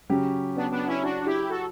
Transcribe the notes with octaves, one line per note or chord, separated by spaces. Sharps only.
C#3 F#3 C#4 G4
B3 D4
B3 D4
C#4 E4
D4 F#4
E4 G4
F#4 A4